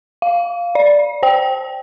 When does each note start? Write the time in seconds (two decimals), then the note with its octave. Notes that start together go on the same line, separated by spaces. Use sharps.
0.22 F5
0.75 D5
1.23 C5 G5